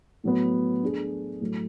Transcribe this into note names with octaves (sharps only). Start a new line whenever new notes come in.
A2 F#3 B3
A3 D4 G#4
A2 F#3 A3